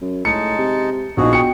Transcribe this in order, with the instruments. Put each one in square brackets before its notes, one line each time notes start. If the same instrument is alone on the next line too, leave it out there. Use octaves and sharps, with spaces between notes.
[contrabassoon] F#2
[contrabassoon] A2 [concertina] G#3 D#4 A5 [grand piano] C#7
[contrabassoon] C3
[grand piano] A#1 D#4 [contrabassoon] B2 [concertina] F#4 G#4
[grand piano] G5 C#7